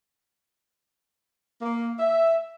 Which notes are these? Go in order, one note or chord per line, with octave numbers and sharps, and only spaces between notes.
A#3
E5